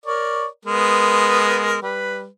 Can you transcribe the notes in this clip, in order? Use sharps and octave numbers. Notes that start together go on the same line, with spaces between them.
A#4 C#5 D5
G#3 B3 A#4
G3 B4